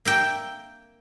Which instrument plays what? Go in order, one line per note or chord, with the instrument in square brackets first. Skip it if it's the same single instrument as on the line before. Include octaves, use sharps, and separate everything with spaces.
[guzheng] A#3 E5 G5